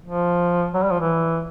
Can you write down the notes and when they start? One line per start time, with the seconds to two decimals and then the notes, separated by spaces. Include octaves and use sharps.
0.05 F3
0.74 F#3
0.83 G3
0.91 F3
1.00 E3